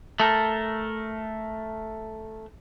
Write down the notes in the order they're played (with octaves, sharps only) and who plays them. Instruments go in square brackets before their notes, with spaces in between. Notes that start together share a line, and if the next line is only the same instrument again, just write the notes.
[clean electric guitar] A3 A4 A#4